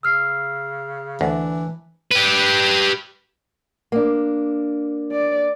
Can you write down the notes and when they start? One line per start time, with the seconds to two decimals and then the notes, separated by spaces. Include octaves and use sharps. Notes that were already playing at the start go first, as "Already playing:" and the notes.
0.03 C#3 E6 F6 C7
1.21 D2 E3 D4
2.11 G4 B4
3.92 A#3 D4
5.12 D5